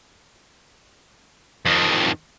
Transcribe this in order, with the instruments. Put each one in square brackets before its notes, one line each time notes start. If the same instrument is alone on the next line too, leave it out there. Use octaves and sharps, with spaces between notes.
[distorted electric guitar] F2 D#3